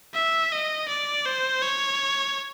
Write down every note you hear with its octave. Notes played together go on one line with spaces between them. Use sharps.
E5
D#5
D5
C5
C#5